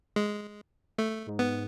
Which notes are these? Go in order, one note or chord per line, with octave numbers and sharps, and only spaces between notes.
G#3
A3
G#2
B3